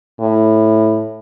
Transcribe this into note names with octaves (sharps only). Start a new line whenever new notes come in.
A2